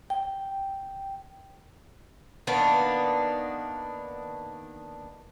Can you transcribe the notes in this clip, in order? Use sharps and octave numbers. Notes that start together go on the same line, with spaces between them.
G5
D#3 A#3 B3 D4